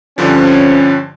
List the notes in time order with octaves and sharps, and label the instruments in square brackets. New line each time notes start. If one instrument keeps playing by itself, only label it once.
[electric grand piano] G2 D3 F3 [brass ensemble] C4 C#4